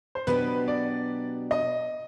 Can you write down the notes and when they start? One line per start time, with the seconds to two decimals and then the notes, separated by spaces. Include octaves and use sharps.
0.15 C5
0.27 B2 F#3 B3 D4 G4 B4
0.68 D5
1.51 D#5